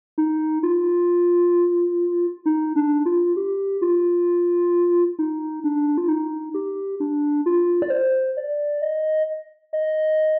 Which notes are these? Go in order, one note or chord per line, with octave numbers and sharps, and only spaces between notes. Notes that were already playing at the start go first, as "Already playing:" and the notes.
D#4
F4
D#4
D4
F4
G4
F4
D#4
D4
F4
D#4
G4
D4
F4
D5
C5
D5
D#5
D#5